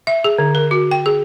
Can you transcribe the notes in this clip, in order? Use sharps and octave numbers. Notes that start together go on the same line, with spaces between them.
E5
G#4
D3
A#4
F#4
G5
G#4